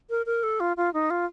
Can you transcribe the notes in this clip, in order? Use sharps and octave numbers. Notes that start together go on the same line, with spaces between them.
A#4
A#4
A4
F4
F4
D#4
F4